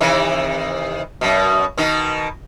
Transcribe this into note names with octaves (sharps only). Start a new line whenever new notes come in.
C3 D#3 E3
F#2 B2
B2 D#3 D#4